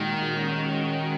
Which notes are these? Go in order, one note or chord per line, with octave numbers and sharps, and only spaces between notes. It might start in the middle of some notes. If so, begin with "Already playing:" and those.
Already playing: A#2 D#3 G#3 D#4 F#4
G#3 C#4 F#4